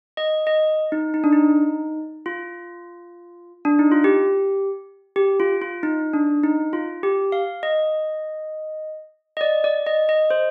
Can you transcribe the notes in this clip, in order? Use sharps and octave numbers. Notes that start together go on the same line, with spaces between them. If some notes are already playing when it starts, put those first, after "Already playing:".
D#5
D#5
D#4
D#4
D4
D#4
F4
D4
D#4
F4
G4
G4
F4
F4
D#4
D4
D#4
F4
G4
F5
D#5
D#5
D5
D5
D#5
D#5
C5